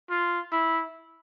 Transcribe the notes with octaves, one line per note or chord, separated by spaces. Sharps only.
F4
E4